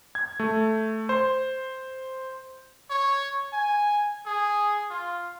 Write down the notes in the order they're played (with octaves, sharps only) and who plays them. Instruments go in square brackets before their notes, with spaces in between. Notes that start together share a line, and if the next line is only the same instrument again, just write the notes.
[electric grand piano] G#6
A3
C5
[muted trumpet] C#5
G#5
G#4
F4